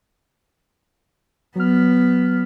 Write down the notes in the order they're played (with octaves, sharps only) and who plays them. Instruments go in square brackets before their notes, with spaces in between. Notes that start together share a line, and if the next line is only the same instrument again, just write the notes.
[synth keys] F#3 F6 [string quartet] B3